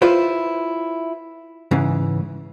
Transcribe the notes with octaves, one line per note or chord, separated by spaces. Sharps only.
E4 F4 B4 C5
G#2 C#3 E3